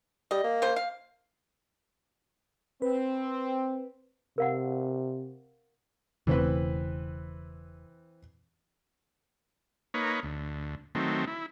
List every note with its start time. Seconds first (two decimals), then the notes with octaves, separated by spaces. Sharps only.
0.31 G3 D#5
0.44 A#3
0.62 C#3 C5
0.76 F5
2.82 C4 B4
4.38 C3 A#4 F5 F#5
6.27 E1 C#3 E3 A3 C4 B4
9.94 A#3 D#4 B4 C#5
10.23 D2
10.95 D#3 F#3 A3 C4
11.27 E4